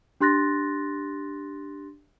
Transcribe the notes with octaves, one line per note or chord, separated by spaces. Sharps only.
D4 G4 C6 F#6 A6 A#6